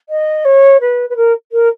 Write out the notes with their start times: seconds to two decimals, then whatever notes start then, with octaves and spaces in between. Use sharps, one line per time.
0.09 D#5
0.45 C#5
0.80 B4
1.09 B4
1.16 A#4
1.52 A#4